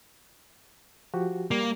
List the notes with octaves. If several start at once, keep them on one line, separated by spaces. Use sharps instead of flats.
F3 F#4 G4
G3 A#3